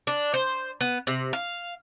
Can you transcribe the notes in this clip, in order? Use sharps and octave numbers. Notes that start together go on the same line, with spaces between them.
D4
C5
B3
C3
F5